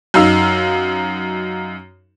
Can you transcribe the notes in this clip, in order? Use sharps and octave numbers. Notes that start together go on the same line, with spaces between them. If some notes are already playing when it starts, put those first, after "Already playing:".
F#2 D#4 F5 E6